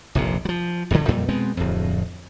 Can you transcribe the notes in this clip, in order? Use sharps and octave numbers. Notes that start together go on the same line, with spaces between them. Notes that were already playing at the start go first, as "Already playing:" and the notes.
F1 A#1 C3
F3 F#3
D#1 F#2 A2 D3
F2 A#2 G3
B2 G#3 B3 C4
D1 F2